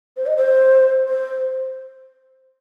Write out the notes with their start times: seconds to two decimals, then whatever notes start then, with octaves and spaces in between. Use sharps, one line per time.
0.17 C5
0.26 D#5
0.37 C5
1.08 C5